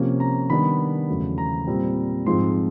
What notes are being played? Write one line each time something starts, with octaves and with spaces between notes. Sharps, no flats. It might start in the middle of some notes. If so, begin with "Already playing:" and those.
Already playing: C3 F3 A#3 C#4
A#5
D#3 G3 B3 D4 B5
E2 C#3 F#3 A3
A#5
A#2 G3 C4
G#2 F3 G#3 C4 C6